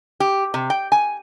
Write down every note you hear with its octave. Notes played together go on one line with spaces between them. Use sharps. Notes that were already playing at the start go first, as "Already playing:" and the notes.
G4
C3
G5
G#5